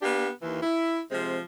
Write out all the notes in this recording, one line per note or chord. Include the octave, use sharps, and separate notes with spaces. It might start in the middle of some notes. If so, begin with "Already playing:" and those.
A#3 B3 D4 G4
D#2 E3
E4
C3 F3 G#3 C4